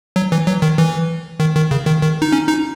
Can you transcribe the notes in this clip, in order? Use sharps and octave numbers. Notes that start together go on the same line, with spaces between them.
F#3
E3
F#3
D#3
E3
D#3
D#3
C#3
D#3
D#3
D#4
C#4
D#4